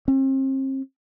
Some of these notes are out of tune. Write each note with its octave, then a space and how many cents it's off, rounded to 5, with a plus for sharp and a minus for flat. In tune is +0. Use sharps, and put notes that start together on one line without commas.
C4 +40